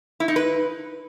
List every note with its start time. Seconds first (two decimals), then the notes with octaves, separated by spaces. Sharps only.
0.20 E4
0.28 D#4
0.36 B4